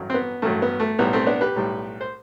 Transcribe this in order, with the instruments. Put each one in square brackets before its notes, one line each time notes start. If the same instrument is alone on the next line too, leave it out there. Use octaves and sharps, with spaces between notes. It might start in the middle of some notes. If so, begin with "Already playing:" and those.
Already playing: [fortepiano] A1 G2 F#3
C4
B3
A1 G2 F#3 A3
B3
A3
B1 A2 G3 B3
A3 C4
B3 D4
G4 B4
B1 A2 G3
C5